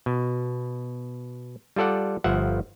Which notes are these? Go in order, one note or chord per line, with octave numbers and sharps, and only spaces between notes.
B2
G3 F4 A4 D5 F#5
G1 F3 E5 F#5